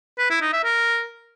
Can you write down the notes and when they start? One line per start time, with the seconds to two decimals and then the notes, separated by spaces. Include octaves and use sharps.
0.19 B4
0.30 E4
0.41 D#4
0.53 E5
0.64 A#4